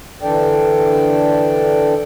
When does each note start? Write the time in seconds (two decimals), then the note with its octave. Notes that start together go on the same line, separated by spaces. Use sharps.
0.23 D3 E3 D4 A4 D5 G5